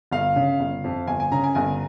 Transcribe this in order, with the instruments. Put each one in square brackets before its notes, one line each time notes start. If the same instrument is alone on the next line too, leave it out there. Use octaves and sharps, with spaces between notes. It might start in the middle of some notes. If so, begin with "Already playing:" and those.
[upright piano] G1 [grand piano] F5
[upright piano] C#3
G1
F2
[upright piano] G1 [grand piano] G#5
[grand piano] G#5
[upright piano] C#3 [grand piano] A#5
[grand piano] G#5
[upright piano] G1 [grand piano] G#5